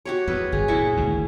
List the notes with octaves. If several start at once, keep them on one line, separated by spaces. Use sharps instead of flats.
F#4 G4 C#5
E2 B4
G1 G#4
E2 A#2 E4 C#6
G#1 D2 G#2